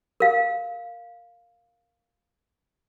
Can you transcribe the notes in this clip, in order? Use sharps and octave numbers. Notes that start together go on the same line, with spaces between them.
A#4 F5